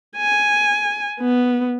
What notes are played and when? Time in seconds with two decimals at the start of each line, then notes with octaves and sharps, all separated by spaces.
0.17 G#5
1.21 B3